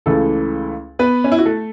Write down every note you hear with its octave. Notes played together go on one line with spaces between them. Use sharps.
C#2 C#3 E3 A3 A4
B3 B4
C#4
E4
F#4
A3 A4